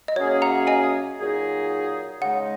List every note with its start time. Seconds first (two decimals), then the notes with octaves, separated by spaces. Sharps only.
0.08 D#5
0.16 F#2 F#3 A#3 C#4 G#4 C#5
0.42 F#5 A#5
0.67 D#5 G#5
1.19 A#2 F#3 D#4 G#4
2.21 C#3 G#3 D#4 F#5